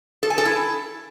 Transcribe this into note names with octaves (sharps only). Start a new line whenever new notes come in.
A4
G#5
A4
E4